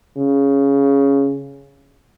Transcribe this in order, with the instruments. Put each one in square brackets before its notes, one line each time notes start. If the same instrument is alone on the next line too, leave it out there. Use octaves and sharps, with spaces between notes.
[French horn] C#3